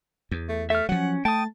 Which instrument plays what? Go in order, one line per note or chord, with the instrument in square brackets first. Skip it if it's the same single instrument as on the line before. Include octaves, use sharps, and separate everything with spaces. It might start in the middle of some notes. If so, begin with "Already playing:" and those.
[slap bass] E2
[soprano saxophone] A3
[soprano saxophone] A3 [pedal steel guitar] E5 F6
[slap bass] F3 F#3 [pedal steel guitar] C#4 [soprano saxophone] F#5
[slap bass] A3 [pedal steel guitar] G5 D#6 [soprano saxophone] A5